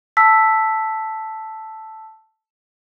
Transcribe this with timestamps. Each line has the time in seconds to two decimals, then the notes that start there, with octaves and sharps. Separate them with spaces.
0.17 A5 E6 B6